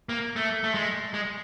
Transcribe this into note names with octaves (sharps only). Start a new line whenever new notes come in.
A#3
A3
A3
G#3
G#3